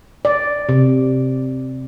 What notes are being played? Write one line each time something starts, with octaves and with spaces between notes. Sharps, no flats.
D5
C3